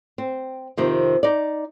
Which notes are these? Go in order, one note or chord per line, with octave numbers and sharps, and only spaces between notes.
C4
F2 C3 D#3 F3
D#4 D5